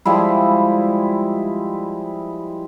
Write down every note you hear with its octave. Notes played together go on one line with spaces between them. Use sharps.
F3 G3 G#3 E4